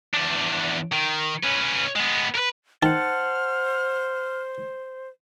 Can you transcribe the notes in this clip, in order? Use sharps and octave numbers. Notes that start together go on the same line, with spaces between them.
E2 D4
D#3
C#4 B4
G#3 B3
A#4 B4
D#3 C5 F#5 A5 F6